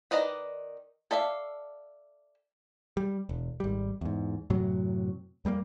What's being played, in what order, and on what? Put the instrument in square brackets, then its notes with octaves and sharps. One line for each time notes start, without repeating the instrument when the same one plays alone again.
[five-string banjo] D#3 B4 D5 D#5 A#5
A4 D5 E5 F5
[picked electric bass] G3
E1
G#1 G3
E2 G#2
F#2 A2 C3 F#3
F2 G3 G#3 A#3